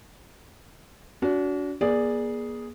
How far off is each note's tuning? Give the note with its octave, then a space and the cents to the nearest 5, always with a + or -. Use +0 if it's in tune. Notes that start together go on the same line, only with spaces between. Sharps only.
D4 -40 F#4 +0
A#3 +45 G#4 +0 D5 +0